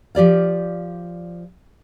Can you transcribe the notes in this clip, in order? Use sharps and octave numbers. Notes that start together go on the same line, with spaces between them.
F3 G4 D5 F5